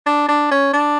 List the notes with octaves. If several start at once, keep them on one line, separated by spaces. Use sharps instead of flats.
D4
D4
C#4
D4